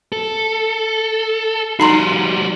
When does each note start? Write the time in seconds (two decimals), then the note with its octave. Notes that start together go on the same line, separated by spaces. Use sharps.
0.12 A4
1.80 G3 D#4 F#4 A#5 C6